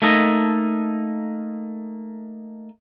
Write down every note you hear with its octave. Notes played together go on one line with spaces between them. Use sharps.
A3 A#3 D#4 A4 D#5